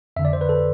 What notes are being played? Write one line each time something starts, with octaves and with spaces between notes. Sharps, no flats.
F2 D3 E5
D5
C5
B4
A4